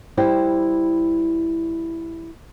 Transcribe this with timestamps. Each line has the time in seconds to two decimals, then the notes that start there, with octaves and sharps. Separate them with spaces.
0.17 G3 E4 C5 G5